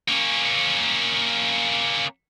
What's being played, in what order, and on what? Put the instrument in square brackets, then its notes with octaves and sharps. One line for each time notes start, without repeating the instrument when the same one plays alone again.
[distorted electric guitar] A#3 C#4